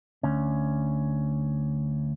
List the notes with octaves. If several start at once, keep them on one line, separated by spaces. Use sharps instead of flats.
D2 C#4